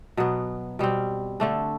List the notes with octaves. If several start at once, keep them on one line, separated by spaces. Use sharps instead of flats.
B2 F#3 B3
B2 G3 C4
D3 A3 D4